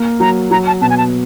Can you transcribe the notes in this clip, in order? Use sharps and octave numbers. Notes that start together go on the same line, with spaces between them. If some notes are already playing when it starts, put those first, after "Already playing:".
Already playing: A#3
F#3 A#5
F#3 A#5
A5
B2 A5
G#5
A5